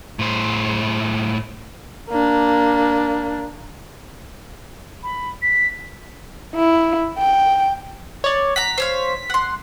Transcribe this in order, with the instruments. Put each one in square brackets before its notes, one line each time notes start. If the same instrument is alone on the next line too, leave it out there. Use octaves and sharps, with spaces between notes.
[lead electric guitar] A2 C5
[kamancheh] A#3 D4
[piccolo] B5
B6
[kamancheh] E4
G5
[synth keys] C#5 D5
[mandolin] F#5 A#5 [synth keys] B6
[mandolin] C5 C#5 F5
F#5 C6